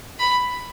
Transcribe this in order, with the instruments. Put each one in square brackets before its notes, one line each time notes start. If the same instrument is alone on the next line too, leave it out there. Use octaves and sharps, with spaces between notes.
[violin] B5